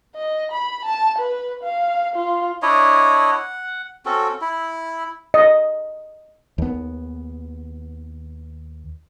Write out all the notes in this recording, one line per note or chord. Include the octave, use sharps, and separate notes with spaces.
D#5
B5
A5
B4
F5
F4
D4 E4 C#5 D#5
F#5
C4 C#4 F#4 A4
E4
D#5
D#2 B3